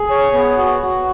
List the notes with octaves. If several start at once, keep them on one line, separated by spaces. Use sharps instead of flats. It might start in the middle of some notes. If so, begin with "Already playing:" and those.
Already playing: G#4
C#5
B3
F#4
F#4